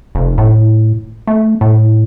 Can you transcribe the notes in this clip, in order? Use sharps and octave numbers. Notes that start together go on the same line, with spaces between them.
F1
A2
A3
A2